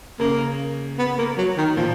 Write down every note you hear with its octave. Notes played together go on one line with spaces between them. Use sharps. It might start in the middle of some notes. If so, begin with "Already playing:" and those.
C#3 A#3
B3
A#3
F#3
D#3
A#2 F3